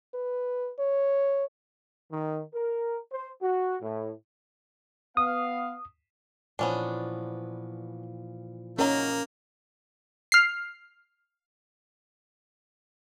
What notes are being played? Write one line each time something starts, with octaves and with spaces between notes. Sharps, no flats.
B4
C#5
D#3
A#4
C5
F#4
A2
B3 F5 D#6
A#2 E3 F3 B3 C#4 D4
F#3 A#3 C#4 D#4 A#4
F6 C7